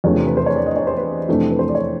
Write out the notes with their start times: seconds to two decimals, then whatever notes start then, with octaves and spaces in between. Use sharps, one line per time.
0.04 E2 C3 F3 A3 D4 C#5
0.27 B4
0.37 C5
0.46 C#5
0.56 D5
0.66 D#5
0.77 C#5
0.87 C5
0.97 B4
1.28 F2 C3 E3 A3 D4
1.51 B4
1.59 C5
1.69 D5
1.75 C#5